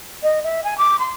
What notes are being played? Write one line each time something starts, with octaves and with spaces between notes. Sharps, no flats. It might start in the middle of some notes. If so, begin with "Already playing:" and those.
D#5
E5
G#5
D6
C6